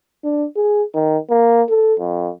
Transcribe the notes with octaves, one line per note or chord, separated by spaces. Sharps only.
D4
G#4
D#3
A#3
A4
F2